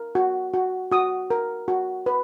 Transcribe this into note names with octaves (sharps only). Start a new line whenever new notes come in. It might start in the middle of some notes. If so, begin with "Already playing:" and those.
Already playing: A#4
F#4
F#4
F#4 D#6
A#4
F#4
B4